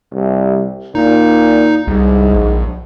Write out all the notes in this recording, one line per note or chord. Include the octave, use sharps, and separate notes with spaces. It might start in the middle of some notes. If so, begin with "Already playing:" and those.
C2
A#2 D#4
C2 G#2
A#1